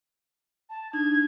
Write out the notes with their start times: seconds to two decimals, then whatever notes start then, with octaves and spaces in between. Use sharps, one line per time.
0.70 A5
0.93 D4 D#4 G#6